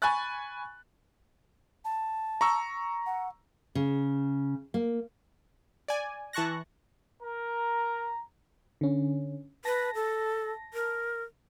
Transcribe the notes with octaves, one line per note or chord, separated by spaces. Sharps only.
G#5 B5 C#6 F#6 A6
A5
A#5 C#6 E6
F#5
C#3
A#3
D5 G#5
E3 A5 C#6 F#6 A#6
A#4 A#5
D3 C#4
B4 A5 A#6
A4
A#4